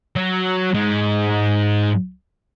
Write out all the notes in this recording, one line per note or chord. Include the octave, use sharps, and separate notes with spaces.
F#3
G#2 G#3